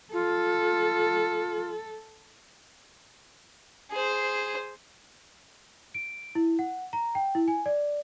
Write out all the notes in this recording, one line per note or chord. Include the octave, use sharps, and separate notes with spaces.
F4 A4
G#4 C5
D7
E4
F#5
A#5
G5
E4
G#5
D5